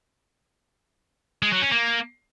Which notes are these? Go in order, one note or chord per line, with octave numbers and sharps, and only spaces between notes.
G#3
F#3
C#4
A#3